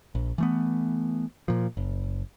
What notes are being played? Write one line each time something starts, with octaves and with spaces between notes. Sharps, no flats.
A#1
E3 A3 B3
A#2 F3
F#1